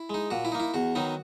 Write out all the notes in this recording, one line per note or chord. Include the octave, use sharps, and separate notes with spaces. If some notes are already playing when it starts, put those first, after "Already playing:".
Already playing: E4
G#3 D#4
A#2 F#4
E4
A#3 D#4
E4
E2 F#4
D#3 F#3 B3 D#4